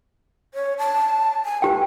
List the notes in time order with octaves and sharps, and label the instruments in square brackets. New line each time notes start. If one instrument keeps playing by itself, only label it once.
[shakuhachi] C#5
A5
G#5
[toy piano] G4 G5 [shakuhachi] B4